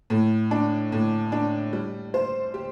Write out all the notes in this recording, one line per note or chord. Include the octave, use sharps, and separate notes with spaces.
A2
D4
A2
D4
G3
C5
G4